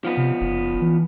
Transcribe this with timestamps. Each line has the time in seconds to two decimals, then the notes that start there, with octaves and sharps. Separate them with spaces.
0.05 F3 B3
0.17 C3
0.41 F#1
0.81 E3